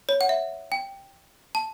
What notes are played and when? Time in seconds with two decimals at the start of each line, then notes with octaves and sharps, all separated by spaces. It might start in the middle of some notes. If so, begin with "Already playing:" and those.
0.09 C#5
0.21 F#5
0.29 E5
0.72 G5
1.55 A5